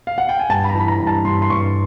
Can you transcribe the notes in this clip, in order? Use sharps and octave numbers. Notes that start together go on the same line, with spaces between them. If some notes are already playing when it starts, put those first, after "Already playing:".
F5
F#5
G5
G#5
G2 A5
B5
A#5
E3 B5
A#5
G2
A5
G2 C6
C6
G2 C#6